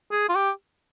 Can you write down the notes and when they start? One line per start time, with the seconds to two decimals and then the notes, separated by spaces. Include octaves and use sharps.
0.11 G#4
0.29 F4
0.35 G4